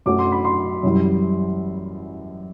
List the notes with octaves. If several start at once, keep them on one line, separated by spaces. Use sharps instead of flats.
F#2 F#3 A3 D6
C6
B5
C6
F#2 E3 G3